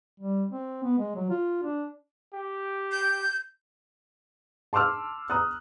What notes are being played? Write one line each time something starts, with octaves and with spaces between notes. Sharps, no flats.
G3
C4
B3
G#3
F#3
F4
D4
G4
G6
A5 C6 D6 E6 F6
A#5 D#6 F#6